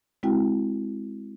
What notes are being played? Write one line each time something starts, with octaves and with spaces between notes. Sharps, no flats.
G#3 C4 E4 F#4 G5